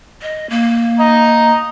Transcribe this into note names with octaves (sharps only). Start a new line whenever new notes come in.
D#5
A#3
D#5 A#5